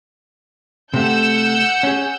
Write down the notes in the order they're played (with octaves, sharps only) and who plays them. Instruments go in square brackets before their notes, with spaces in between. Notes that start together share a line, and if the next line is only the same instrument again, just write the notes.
[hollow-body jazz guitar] C3 A3 [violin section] F#5 E6 G6
[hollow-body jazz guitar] C#4 G#4